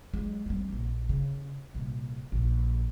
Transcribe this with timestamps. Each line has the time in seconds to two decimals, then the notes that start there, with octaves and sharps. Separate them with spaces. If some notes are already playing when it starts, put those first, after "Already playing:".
0.14 F#3 G#3
0.46 G3 C4
0.69 A#1 A#3
1.09 C#3
1.75 C2 A#2
2.32 A#1